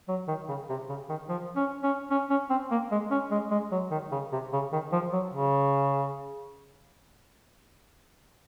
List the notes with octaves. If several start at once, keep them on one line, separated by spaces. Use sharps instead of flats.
F#3
D#3
C#3
C3
C#3
D#3
F3
C#4
C#4
C#4
C#4
C4
A#3
G#3
C#4
G#3
G#3
F#3
D#3
C#3
C3
C#3
D#3
F3
F#3
C#3